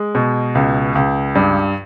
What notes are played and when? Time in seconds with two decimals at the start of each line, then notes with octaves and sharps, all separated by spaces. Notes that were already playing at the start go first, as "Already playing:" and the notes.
Already playing: G#3
0.15 B2
0.55 C#2
0.95 C#2
1.35 G2